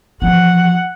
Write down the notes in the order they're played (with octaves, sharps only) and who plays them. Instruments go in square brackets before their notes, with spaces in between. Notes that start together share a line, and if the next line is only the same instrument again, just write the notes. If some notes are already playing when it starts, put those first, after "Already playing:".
[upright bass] E3 F3 [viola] F#5